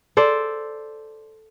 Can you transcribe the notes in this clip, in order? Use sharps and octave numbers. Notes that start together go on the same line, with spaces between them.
A4 C5 D5